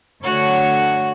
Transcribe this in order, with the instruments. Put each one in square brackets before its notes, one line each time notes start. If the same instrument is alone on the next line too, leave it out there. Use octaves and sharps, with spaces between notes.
[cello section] D3 A3 C#5 [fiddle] F#4 F#5